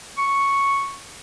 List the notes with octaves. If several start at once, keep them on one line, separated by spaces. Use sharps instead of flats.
C#6